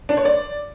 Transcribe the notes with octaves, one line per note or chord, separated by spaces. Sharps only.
D4
C#5
D5